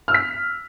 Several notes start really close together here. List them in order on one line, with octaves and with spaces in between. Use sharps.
F6 E6 B6